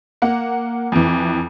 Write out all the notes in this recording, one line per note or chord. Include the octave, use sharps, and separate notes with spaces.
A#3 F#5
F2 E3